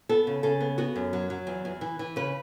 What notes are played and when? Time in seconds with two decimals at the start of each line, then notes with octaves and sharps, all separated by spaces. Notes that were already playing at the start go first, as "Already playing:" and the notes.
0.09 B3 A4
0.27 C#3
0.43 C#3 A4
0.61 B3
0.78 B3 F#4
0.96 F#2
1.13 F#3
1.30 F#3
1.47 E2
1.65 E2
1.81 E3
1.99 E3
2.16 C#3 B4